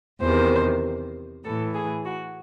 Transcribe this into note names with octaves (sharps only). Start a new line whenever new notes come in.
E2 C3 D#3 C5
A2 E3 A4
G#4
F#4